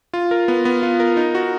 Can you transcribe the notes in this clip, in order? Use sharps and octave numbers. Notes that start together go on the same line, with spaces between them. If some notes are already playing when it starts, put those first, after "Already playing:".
F4
A#4
B3
B3
F4
A#4
D#4
F#4